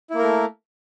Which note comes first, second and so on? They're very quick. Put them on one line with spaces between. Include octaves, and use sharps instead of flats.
E4 A#3 A#4 A3